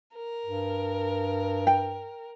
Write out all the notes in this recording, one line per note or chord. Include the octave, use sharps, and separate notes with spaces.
A#4
G2
G5